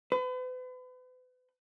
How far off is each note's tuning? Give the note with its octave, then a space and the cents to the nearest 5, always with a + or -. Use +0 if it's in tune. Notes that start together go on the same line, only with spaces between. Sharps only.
B4 +40